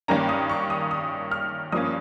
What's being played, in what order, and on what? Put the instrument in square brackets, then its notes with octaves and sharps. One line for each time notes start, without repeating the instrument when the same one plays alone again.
[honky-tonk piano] G2 D#3 A#3 C#4 A#5
D#6
C#6
D#6
D#6
F6
G2 F3 A#3 C#4 D#6